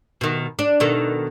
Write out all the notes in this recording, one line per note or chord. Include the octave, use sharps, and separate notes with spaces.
B2 D#3
D4
B2 D#3 A4